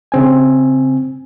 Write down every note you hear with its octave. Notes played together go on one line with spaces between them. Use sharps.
C#3 C4 G#5